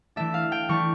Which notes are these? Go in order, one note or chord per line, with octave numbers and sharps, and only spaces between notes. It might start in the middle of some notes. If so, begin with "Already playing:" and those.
E3 A3 D4 E5
F5
G5
E3 A3 D4 C#6